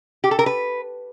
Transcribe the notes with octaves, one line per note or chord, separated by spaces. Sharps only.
G4
A4
A#4
B4